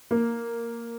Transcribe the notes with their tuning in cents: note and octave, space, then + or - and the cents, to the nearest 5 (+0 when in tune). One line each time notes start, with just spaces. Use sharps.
A#3 -5